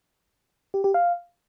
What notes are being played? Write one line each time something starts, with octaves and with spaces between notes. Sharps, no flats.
G4
G4
F5